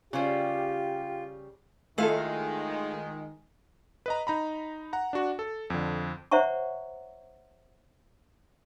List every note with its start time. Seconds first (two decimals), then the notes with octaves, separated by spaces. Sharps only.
0.13 C#3 G3 F4 G4 C5
1.98 D#3 G#3 A3 E4 F4 G#4 A4 F5
4.06 B4 D#5 A#5
4.27 D#4 A#5 B5
4.93 F#5 A#5
5.13 D4 F#4
5.39 A4
5.70 F2 D3
6.31 C5 C#5 E5 F#5 A#5 C#6